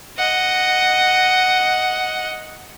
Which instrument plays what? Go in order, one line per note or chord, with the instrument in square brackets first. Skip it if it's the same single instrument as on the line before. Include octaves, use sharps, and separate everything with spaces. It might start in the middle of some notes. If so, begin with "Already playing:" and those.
[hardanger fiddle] D#5 F#5